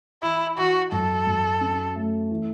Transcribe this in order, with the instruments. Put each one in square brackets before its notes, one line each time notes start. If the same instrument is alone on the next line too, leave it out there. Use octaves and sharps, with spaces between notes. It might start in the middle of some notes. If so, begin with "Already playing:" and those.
[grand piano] E3 [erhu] E4
[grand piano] E3 [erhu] F#4
[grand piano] F#2 [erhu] A4
[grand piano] F#2
C#4
A3
E3